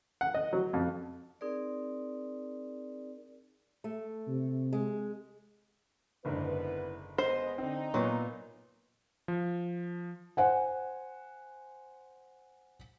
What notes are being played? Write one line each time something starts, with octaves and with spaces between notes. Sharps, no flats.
F#5
D#5
F#3
F2
C4 D#4 G#4 A#4 D5
A3
C3
G#3
F#1 G#2 D3 B3 E4 B4
G#3 B3 C5 D#5
D3 C4 D#4
A#2 F#3 B3 C6
F3
C5 F#5 G#5